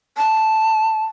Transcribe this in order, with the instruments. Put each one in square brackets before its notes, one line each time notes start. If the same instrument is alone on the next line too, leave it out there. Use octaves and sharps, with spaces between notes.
[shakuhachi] A5